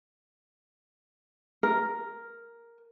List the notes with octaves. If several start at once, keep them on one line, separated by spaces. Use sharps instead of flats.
A#4